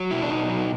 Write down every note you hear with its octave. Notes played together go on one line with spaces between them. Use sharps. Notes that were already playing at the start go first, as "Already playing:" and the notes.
Already playing: F#3
B2 E4
D4
B2 D#4
F#3